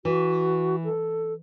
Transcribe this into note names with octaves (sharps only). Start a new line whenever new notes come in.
E3 F#4
A4